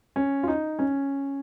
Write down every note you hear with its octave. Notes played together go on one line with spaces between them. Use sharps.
C#4
F4
D#4
C#4